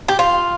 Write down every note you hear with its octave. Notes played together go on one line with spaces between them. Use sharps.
G4
F4